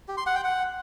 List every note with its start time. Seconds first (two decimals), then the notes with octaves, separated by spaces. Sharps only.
0.08 G4
0.17 C6
0.26 F#5
0.35 G5
0.44 F#5